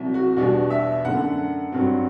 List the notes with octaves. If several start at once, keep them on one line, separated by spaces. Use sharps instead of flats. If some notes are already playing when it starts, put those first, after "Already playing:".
Already playing: C2 C3 F#3
F#4
E2 B2 G3 D4 F#4
E5
F#2 D3 A3 F#5
G2 F#3 C4